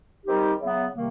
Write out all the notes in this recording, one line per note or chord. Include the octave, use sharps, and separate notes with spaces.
D#3 G3 C4 D#4 G4
C#3 F#3 B3 E4
C3 D#3 G3 A#3